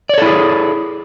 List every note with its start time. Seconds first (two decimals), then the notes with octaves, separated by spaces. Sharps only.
0.09 D5
0.14 C#5
0.18 A4
0.22 E4
0.26 G#4